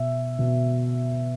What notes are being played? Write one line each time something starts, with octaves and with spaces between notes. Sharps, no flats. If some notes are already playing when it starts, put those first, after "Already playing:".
Already playing: B2 E5
B2